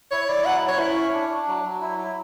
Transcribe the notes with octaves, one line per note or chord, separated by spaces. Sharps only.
E4 C#5
E4 D5
F#3 F#5
B4
C#5
C#4 E4
C#5
D4
D4
F#3
F#3
E4
E4